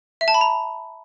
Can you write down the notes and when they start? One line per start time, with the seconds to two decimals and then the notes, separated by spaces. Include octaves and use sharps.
0.21 E5
0.28 A5
0.34 B5
0.41 A#5